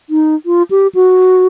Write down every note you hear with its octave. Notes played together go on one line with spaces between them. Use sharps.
D#4
F4
G4
F#4